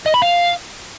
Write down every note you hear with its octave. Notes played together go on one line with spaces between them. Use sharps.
D#5
B5
F5